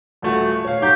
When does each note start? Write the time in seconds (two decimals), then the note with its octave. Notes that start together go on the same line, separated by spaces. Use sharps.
0.22 D#1 A3 F#4
0.65 C#5 F5
0.82 F#3 D#4 G4 G6